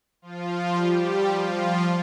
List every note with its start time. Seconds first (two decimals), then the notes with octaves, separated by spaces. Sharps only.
0.22 F3 F4
0.75 G3 G4
1.27 F3 F4